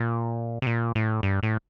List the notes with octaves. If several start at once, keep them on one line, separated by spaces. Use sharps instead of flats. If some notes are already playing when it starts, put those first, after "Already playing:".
Already playing: A#2
C3
A#2
A2
G2
A2